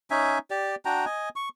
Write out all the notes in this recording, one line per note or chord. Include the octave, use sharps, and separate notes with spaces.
C#4 D#4 E5 G#5
G4 D5
D4 F#4 G5 A#5
D#5 G#5
C#6